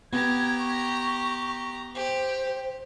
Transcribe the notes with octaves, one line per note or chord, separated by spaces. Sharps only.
B3 G4 A#5 G#6
C#6
G4 C5